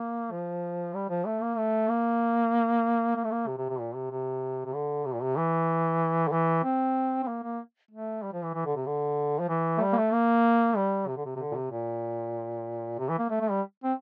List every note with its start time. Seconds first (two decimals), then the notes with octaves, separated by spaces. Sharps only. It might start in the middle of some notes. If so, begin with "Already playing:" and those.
Already playing: A#3
0.31 F3
0.94 G3
1.09 F3
1.26 A3
1.42 A#3
1.57 A3
1.89 A#3
3.16 A#3
3.24 A3
3.31 A#3
3.47 C3
3.57 C3
3.69 C3
3.80 A#2
3.95 C3
4.11 C3
4.65 C3
4.74 D3
5.05 C3
5.14 A#2
5.22 C3
5.37 E3
6.28 D3
6.32 E3
6.64 C4
7.23 C4
7.27 A#3
7.43 A#3
7.91 A3
8.23 G3
8.33 F3
8.43 E3
8.54 E3
8.66 D3
8.76 C3
8.87 D3
9.39 F3
9.49 E3
9.78 A3
9.81 G3
9.93 A#3
9.97 A3
10.13 A#3
10.77 G3
11.08 C3
11.17 D3
11.26 C3
11.36 C3
11.39 D3
11.52 A#2
11.56 C3
11.71 A#2
12.99 C3
13.09 E3
13.19 A#3
13.30 A3
13.41 A3
13.51 G3
13.84 C4